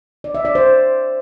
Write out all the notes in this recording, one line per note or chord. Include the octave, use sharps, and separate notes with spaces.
D5
E5
D5
C5